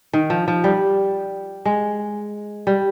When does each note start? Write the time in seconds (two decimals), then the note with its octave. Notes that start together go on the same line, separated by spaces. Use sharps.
0.13 D#3
0.30 F3
0.48 F3
0.64 G3
1.65 G#3
2.67 G3